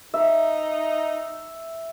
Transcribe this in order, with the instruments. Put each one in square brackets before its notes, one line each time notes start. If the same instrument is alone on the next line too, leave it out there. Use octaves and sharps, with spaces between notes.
[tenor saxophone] D#4 [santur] E5